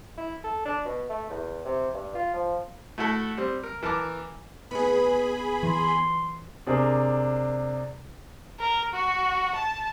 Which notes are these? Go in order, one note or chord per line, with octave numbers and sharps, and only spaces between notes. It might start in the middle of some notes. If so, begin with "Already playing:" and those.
E4
A4
D4
B2
A3
E2
C3
G2
F4
F3
A3 E4 F#4 A4
G3 C4
A#4
E3 A#4 A5 D6
D#2 B3 G#4 B4 B5
E3 C6
C3 D4 G#4 A#4
A#4
F#4
A5